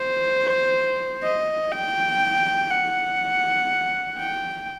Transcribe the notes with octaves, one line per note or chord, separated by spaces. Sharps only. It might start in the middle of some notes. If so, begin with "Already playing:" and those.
Already playing: C5
D#5
G5
F#5
G5